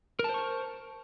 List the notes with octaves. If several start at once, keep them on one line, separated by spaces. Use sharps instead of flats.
A#4 C5 A5 C#6